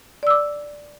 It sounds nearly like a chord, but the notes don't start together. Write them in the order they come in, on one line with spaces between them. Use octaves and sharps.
D5 E6 D6